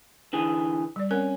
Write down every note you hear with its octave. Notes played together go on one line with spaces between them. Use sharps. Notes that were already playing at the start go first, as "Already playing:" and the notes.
D3 E3 G#4
G3 D5
C4 C#4 A#4